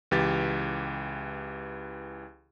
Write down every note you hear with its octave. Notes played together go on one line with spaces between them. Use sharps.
C#2 E3 G4 A6